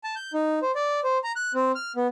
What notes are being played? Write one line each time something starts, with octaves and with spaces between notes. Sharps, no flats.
A5
G6
D#4
C5
D5
C5
A#5
F#6
C4
F6
B3